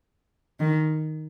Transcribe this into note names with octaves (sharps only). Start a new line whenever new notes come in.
D#3